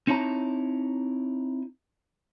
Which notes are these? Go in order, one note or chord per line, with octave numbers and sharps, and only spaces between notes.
C4 D#4 E4 C#5 A5 A#5